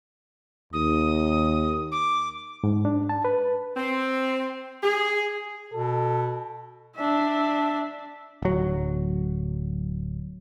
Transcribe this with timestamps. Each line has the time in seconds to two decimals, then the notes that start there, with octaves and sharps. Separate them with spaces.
0.73 D#2 D#6
1.92 D6
2.64 G#2
2.85 D4
3.09 A5
3.25 B4
3.76 C4
4.82 G#4
5.73 B2 A4
6.96 D4 E5
8.42 D1 F#3